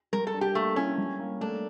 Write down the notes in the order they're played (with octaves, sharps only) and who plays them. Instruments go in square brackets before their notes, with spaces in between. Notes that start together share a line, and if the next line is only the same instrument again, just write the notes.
[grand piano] G3 [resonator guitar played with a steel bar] A#4
[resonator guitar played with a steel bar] A4
[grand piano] D4
[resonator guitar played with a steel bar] G4
[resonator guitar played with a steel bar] A3 [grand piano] A#3
[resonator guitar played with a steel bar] C#4 [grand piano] E4
[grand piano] G3
A#3
[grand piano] A3 [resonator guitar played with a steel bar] D4